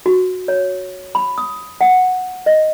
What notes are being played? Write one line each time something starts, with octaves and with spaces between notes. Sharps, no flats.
F#4
C#5
B5
D#6
F#5
D#5